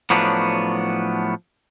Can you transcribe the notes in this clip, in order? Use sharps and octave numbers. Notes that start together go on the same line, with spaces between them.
A2 F3 F#3 B3 D4